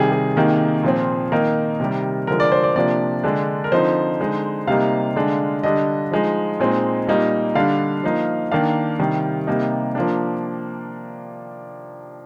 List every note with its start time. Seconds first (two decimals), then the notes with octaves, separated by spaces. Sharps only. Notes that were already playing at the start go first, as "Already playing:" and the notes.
Already playing: C3 D#3 G3 G#4
0.12 G#4
0.36 C3 D#3 A#3 D#4
0.83 A#2 F3 C4
1.32 D#3 A#3 D#4 A#4
1.80 C3 D#3 G3
2.27 D3 F3 G#3 A#4
2.40 D5
2.52 C5
2.63 D5
2.76 C3 F3 A#3 D4 D5
3.24 D3 G#3 D4
3.64 A#4
3.72 D3 F3 C4 D#4 C5
4.20 D3 G#3 D#4
4.67 C3 G3 A#3 D#4 F5
5.15 D3 G#3 D4
5.63 D3 G3 D4 D#5
6.12 F3 G#3 D#4
6.60 A#2 G#3 C4 D#4
7.07 A#2 G3 A#3 D#4
7.55 D3 G3 D4 F5
8.03 F3 A#3 D#4
8.51 D#3 A#3 D4 F5
8.99 C3 D#3 G3
9.47 C3 G3 A#3 D#4
9.95 F3 A#3 D4